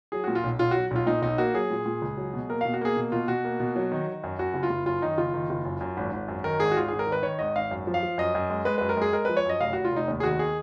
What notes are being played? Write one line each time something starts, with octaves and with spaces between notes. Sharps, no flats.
F#3 G#4
A#2 F#4
F4
B1
B1 F4
F#3 F#4
B1 F4
A#2 D#4
B1 D#4
A#3 F#4
F#3 G#4
A#2
A#2
C#2
F#3
B2
A#3 A#4
B2 F5
F#4
A#3 G#4
B2
B2 F4
B2 F#4
A#3
B2
F#3
D#3
D#3
F#2
F#2 F#4
F#1
F4
F#1
F#2 F4
D#3 D#4
F#1 F4
D#3
F#1
F#2
F#2
G#1
G#1
F#2
D#3 A#4
G#1 G#4
F#4
G#1 F4
G#1 G#4
A#4
D#3
B4
D#3 C#5
G#1 D#5
G#1 F5
F#2
F3
F5
F3
F#2 D#5
F#2
G#3
G#3 B4
F#2 B4
A#4
G#3 G#4
G#3 A#4
F3 B4
C#5
F#2 D#5
F1 F5
F1 F#4
F4
F1 D#4
D#2
G#4
D#3 F#4
G#4